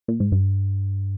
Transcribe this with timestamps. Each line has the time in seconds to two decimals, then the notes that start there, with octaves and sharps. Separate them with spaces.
0.08 A#2
0.20 G#2
0.32 G2